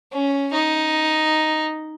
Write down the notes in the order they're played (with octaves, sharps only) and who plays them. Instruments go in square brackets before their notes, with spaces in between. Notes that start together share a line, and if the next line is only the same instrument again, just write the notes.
[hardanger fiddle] C#4
D#4